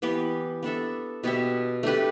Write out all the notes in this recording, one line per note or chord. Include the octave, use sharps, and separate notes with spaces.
E3 B3 G4 B4
B3 D4 A4 E5
B2 B3 G4 E5
A3 D4 G4 B4